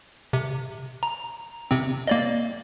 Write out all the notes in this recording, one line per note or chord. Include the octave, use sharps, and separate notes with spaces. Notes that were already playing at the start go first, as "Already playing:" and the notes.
C3
A#5
C3 C4
A#3 D5 D#5